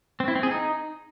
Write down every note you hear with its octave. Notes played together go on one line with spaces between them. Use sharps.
C4
E4
C4
G#4
D#4